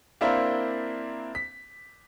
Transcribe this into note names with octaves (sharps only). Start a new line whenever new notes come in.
A#3 C4 D4 E4 A#4 C5
B6